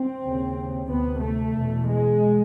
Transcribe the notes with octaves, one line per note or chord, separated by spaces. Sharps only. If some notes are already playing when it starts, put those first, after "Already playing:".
Already playing: C4
D#2 C#3
D2 C3 B3
A3
E2 B2
G#3